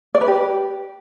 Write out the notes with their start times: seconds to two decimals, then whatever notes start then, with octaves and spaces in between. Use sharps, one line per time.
0.15 D5
0.21 B4
0.28 G4